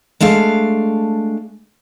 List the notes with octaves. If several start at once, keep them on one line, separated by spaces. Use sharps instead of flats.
G#3 A3 D4 F5